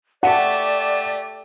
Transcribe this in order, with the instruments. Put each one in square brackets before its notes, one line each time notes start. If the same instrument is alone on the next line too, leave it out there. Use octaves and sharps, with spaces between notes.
[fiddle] A3 G4 [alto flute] D5 [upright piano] F#5 A5